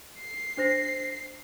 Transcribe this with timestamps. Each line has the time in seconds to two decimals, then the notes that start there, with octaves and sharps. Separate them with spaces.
0.18 C7
0.57 D4 C5 A#6